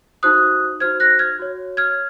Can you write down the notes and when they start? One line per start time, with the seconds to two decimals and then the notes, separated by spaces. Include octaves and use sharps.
0.23 D#4 F#4 C5 D#6 F#6
0.80 D#4 F#4 C5 F6 G#6
1.00 F#6 A#6
1.19 F6 G#6
1.39 F#4 C#5
1.77 F6 G#6